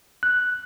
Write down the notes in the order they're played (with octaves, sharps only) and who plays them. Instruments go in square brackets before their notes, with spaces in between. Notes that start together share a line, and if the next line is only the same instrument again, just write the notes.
[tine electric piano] F#6